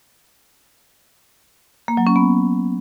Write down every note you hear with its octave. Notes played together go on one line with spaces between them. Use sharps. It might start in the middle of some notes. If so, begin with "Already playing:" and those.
A#3
F#3
C#4
B3